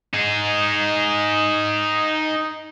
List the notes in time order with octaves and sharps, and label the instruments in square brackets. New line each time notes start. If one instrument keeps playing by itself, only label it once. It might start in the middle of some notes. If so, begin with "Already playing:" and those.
[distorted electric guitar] D#4 G#4